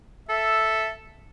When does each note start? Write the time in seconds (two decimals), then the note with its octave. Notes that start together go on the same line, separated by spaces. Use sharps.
0.29 A4 E5